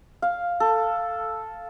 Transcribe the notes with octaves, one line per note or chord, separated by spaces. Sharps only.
F5
A4